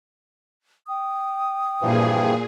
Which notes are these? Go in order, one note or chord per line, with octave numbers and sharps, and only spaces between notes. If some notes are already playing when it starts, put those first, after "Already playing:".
G5 D#6
G2 A#2 E3 F3 G#4